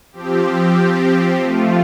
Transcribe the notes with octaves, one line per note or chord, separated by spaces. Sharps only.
F3 C4 G4
F3 A3 F4